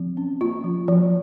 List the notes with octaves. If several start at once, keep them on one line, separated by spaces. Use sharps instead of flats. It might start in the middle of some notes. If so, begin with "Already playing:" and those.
Already playing: F3 C4
C#4
A#3 F4
F3
F3